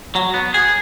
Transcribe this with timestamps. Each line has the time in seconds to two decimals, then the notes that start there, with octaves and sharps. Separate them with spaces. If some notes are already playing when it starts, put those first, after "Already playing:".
0.15 F#3
0.34 B3
0.54 G#4